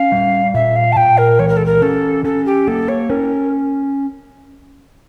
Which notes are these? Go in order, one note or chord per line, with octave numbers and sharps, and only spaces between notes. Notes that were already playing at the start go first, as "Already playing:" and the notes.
Already playing: C#4 F5
G3
A#2 E5
F5
A5
A#2 G5
A#4
E3 C#5
A#4
A4
A#4
C#4 A4
C#4 A4
G4
A#3 A4
C#5
C#4 A#4